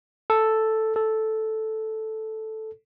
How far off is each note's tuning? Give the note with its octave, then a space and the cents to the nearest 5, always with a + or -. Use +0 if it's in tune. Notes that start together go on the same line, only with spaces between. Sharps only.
A4 +0
A4 -5